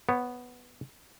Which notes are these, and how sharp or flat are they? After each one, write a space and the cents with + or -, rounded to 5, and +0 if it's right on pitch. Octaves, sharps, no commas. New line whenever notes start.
B3 +0 C#5 -25